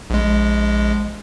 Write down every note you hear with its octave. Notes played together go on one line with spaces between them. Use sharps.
A#1 G#3